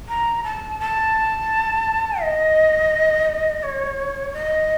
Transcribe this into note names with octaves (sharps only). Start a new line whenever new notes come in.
A#5
A5
A5
D#5
C#5
D#5